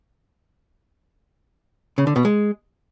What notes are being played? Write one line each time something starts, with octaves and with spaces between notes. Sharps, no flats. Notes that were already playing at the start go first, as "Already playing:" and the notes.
C#3
D3
B2
G#3